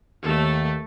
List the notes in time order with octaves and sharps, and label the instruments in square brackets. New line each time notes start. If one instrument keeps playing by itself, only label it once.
[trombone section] D#2 [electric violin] A3 A4